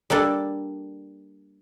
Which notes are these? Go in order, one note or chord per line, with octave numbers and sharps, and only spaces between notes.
G3 A#3 D4 A4